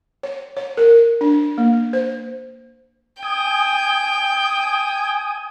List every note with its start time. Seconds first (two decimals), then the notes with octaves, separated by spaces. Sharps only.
0.23 C#5
0.57 C#5
0.77 A#4
1.21 D4
1.58 A#3
1.93 C5
3.23 G5 G#5 D#6